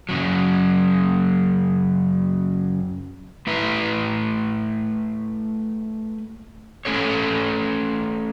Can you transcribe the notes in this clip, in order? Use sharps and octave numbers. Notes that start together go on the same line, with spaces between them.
F#2 C#3 F#3
A3 E4 B4 E5
A3 C#4 A4 C#5